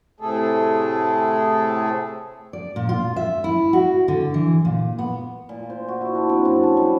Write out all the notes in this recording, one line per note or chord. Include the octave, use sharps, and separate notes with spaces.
A2 C3 A3 G#4 A4
D5
A#2
F4
E5
E4
F#4
D3
E3
A#2
B3
A#2
C5
F#4
E4
D4
C4
F#2
A5
G3